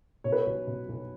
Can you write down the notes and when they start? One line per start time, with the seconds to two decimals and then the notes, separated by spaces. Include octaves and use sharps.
0.24 B2 C#5
0.32 B4
0.41 C#5
0.46 B1
0.67 B2
0.89 B1